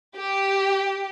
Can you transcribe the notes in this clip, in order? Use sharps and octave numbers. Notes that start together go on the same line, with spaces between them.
G4